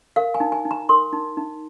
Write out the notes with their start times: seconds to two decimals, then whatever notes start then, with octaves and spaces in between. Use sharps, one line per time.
0.16 A#4 F5
0.34 G#5
0.40 D#4
0.52 G#5
0.65 D#4
0.71 A#5
0.89 A#4 C6
1.13 D#4
1.37 D#4